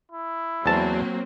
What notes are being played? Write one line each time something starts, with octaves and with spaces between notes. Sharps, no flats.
E4
E2 F#3 A#3 C4 A5